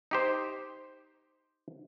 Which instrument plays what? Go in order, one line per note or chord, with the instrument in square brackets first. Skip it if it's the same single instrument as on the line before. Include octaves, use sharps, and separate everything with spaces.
[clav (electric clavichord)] D#4 G4 C5